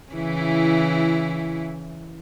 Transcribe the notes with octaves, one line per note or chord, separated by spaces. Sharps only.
C#3 E3 E4